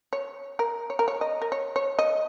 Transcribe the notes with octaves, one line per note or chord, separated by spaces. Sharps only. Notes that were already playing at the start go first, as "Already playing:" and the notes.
C#5
A#4
C#5
A#4
C#5
D#5
A#4
C#5
C#5
D#5